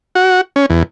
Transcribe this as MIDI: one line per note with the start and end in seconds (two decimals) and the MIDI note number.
0.15 0.41 66
0.56 0.66 61
0.70 0.83 40